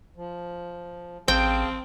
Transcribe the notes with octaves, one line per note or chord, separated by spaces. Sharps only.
F3
A1 C4 G#4 F5 G5 A5